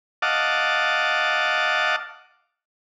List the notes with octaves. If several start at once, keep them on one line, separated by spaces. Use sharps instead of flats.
D#5 F5 F#5 A5 D6